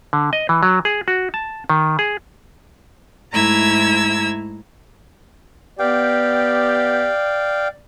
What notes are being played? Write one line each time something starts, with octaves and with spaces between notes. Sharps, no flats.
D3
D#5
E3
F#3
G#4
F#4
A5
D#3
G#4
G#2 A3 E4 A#5 E6 G#6
B3 G4 D5 F5 G5